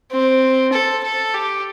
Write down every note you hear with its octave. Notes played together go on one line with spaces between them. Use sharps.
C4
A4
A4
G4